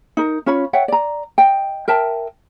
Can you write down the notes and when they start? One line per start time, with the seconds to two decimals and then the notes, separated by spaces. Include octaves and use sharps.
0.17 D#4 A#4
0.46 C#4 F4 C#5 B5
0.73 C#5 E5 F#5 G5
0.88 D5 A#5
1.38 D#5 G5
1.88 A#4 E5 G5 A5